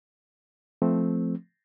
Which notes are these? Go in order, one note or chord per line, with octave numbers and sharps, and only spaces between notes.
F3 A3 C4